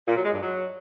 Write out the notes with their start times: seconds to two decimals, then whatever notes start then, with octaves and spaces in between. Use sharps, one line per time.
0.07 A#2
0.16 F#3
0.25 G#3
0.33 G2
0.42 F#3